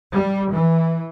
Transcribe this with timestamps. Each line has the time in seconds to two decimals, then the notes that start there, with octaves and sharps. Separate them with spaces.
0.12 G3
0.51 E3